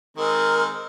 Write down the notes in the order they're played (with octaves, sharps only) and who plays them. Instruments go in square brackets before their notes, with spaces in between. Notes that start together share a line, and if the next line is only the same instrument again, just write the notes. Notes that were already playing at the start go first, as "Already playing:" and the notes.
[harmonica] D#3 G#3 C4 [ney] A#4